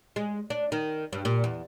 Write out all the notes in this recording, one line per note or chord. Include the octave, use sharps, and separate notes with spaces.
G#3
D4
D#3
G2
A#2
E2